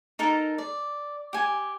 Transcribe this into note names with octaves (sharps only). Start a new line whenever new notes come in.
D#4 A4 A#4 A5
D5
G4 G#5